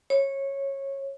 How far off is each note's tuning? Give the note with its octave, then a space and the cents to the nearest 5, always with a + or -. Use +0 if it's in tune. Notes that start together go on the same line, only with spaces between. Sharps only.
C#5 -15